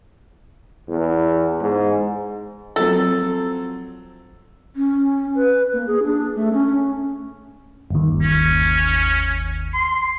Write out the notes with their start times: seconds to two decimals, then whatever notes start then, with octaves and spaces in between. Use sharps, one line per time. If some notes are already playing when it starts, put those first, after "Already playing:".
0.88 E2
1.61 G#2
2.76 F3 F#3 C4 A4
4.76 C#4
5.35 B4
5.73 A#3
5.87 G#4
6.04 D4
6.35 A3
6.53 C#4
7.90 G1 D#2
8.22 C#4
9.74 C6